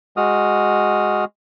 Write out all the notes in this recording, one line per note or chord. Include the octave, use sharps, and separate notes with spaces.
G#3 F#4 D#6 F6